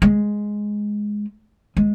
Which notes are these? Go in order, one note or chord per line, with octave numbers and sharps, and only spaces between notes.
G#3
G#3